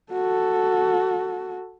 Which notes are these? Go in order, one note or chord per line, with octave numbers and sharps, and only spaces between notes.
F#4 A4